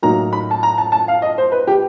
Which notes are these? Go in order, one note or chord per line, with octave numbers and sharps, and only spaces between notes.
A2 F#3 A#3 D#4 A#5
B5
A5
A#5
A5
A5
F5
D#5
C5
B4
G4